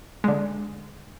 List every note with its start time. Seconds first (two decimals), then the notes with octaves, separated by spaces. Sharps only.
0.24 D3 G#3